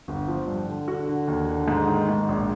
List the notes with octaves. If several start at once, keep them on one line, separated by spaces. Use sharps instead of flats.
G1
F3
G2
D3
D3 F#4
D3
D#2
D3
G#2
D#3
G#2
A#1